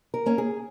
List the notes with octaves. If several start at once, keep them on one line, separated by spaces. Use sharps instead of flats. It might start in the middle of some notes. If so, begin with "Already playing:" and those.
A#4
A#3 C#4
G#4